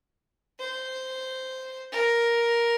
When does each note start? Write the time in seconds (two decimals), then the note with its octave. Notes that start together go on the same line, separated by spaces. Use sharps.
0.59 C5
1.92 A#4